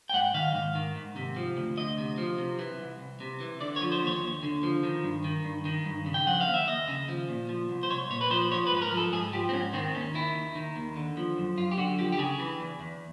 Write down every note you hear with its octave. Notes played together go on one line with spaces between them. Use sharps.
G5
G#2 F#5
D#3 F5
G#2
D#3
G#2
C3
F3
D2
D2 D#5
C3
F3
C3
E3
C2
C2
C3
E3
D3 D5
C#5
F3
C5
D#2
C#5
D#2
D3
F3
D#3
G2
D#3
G2
D#3
G2
C#3
G5
F3 F#5
F5
D#2
E5
D#2 D#5
C#3
F3
A#2
F3
C2
C5
C2 C#5
A#2 C#5
B4
F3 C5
F3 C#5
B4
G#2
B4
A#4
F3
A4
G#2 G#4
F3 G4
C4
G#2 C#4
D#3 C4
D#2 C#4
D#3 E4
D#2
D#3
D#2
D3
F3
F#2
F#2 F4
G4
D3 F#4
F3 G4
G4
C#3 G#4
E3
E2
E2